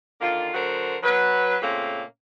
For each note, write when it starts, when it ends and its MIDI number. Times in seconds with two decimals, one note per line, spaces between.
0.21 0.53 50
0.21 0.53 51
0.21 0.53 58
0.21 0.53 65
0.54 0.97 50
0.54 0.97 54
0.54 0.97 66
0.54 0.97 70
0.54 0.97 72
1.03 1.56 54
1.03 1.56 71
1.62 2.03 46
1.62 2.03 49
1.62 2.03 57
1.62 2.03 58
1.62 2.03 60
1.62 2.03 61